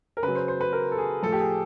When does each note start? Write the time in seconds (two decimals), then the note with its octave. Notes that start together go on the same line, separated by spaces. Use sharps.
0.17 A#4
0.23 C#3 F#3 B4
0.36 C5
0.48 C5
0.61 B4
0.73 A#4
0.92 A4
0.98 G#4
1.23 A2 F3 A4
1.33 G4
1.40 G#4